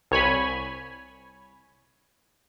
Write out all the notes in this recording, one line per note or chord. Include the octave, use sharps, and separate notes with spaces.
C2 C#5 G#5 B5